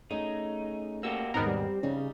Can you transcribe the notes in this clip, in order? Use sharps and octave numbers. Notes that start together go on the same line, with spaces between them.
A3 C#4 D#4 G#4
A#3 F#4 G4 E6
D#2 G#2 B2 B3 C4 D#4 A#4
G3
C#3 G3 D#4